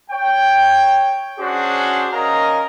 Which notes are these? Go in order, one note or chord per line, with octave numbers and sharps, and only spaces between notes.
C#5 G5
C#4 D4 F#4 G#4 C5
C#4 A#4 D#5 F5 A#5